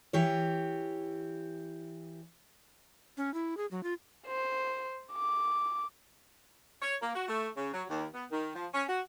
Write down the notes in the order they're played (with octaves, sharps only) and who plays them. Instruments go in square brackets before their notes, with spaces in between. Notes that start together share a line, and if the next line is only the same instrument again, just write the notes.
[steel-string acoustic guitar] E3 G4 C#5
[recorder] C#4
E4
G#4
F#3
F4
[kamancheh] C5
D6
[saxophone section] C#5
A#3
F#4
A3
C#3
F#3
D#2
B3
D#3
F3
C#4
F#4